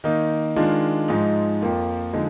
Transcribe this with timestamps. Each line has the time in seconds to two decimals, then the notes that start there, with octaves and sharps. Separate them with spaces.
0.04 D#3 A#3 D#4
0.56 D#3 G#3 D4 F4
1.08 G#2 F3 G#3 D#4
1.61 F2 F3 A#3 F4
2.13 D3 F3 G#3 D#4